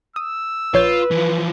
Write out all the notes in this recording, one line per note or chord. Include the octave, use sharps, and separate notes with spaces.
D#6 E6
A#1 F4 B4 C#5 G6
E3 F3